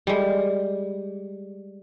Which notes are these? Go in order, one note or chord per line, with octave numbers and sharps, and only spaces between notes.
G3 G#3